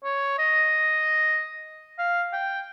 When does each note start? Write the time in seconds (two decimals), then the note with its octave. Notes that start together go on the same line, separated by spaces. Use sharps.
0.04 C#5
0.38 D#5
1.98 F5
2.33 G5